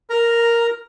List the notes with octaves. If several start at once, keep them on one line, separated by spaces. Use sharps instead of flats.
A#4 A#5